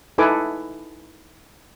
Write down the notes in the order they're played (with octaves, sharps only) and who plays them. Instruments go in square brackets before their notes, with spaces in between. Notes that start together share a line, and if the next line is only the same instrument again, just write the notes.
[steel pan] D#4 E4 A4 B4 G#5 D6